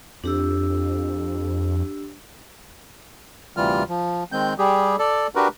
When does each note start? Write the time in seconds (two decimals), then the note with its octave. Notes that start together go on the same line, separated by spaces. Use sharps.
0.24 F2 D4 G4 E6
3.57 D2 C3 E3 G3 F4 F6
3.88 F3
4.32 D#3 G#3 C4 G6
4.58 G3 G4 G#4
4.99 A4 D5
5.35 D4 F#4 G4 A#4 B4